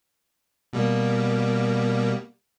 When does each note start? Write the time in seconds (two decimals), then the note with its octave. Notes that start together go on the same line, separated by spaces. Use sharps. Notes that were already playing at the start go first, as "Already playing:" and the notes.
0.73 B2 G3 A#3